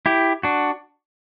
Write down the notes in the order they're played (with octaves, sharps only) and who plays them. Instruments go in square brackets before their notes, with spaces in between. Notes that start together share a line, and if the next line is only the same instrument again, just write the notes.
[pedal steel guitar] E4 G4
D4 F#4